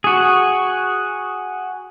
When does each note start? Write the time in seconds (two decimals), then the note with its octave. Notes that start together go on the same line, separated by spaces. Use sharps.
0.04 F#4 G#4